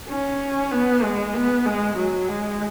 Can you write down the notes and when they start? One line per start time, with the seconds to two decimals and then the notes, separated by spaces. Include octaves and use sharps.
0.09 C#4
0.71 B3
1.03 G#3
1.34 B3
1.65 G#3
1.96 F#3
2.28 G#3